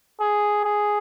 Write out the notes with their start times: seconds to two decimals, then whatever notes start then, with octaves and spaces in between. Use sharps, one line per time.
0.20 G#4
0.64 G#4